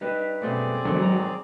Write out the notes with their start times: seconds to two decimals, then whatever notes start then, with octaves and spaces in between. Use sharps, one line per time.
0.01 G3 D#4 B4
0.41 F#2 B2 A3 C4 G#4 D5
0.85 E2 G#2 D3 D#3 F#3
1.02 A#5